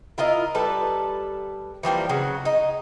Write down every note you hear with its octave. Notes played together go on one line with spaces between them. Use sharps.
E4 F4 A#4 D#5
G3 A4 B4 A5
E3 F3 G3 A#3
C#3 F#3
D#4